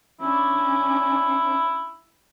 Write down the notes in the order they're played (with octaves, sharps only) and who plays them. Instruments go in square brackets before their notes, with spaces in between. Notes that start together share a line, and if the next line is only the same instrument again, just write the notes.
[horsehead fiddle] C#4 D4 [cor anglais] E4